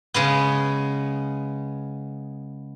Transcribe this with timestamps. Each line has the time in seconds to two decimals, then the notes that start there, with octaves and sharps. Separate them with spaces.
0.14 C#3 G#3 B3